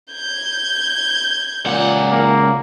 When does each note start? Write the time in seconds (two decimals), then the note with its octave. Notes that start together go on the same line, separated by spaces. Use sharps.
0.12 G6 G#6
1.66 C#2 A#2 F#5
2.11 A#3